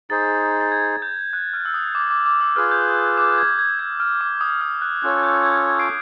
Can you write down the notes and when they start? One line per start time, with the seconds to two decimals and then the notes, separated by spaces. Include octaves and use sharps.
0.10 D#4 G#4 C5 A6
0.61 A6
0.72 G#6
1.02 G6
1.33 F#6
1.53 F6
1.65 E6
1.74 D#6
1.95 D6
2.10 D6
2.26 D6
2.41 E6
2.56 F4 G#4 B4 F6
2.71 G6
3.18 D6
3.38 G#6
3.59 G#6
3.79 G#6
4.00 F6
4.21 D6
4.41 D#6
4.61 F6
4.82 F#6
5.03 C#4 F4 A4 C#5 F#6
5.23 G6
5.43 G#6
5.64 G#6
5.79 C7 D7